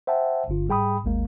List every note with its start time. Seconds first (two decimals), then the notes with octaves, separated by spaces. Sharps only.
0.07 C5 E5 F#5 G5 A5
0.48 G1 G2 D3 F4
0.68 G#2 G3 G#4 G5 B5 D#6
1.04 G#1 D#2 G#3 A#3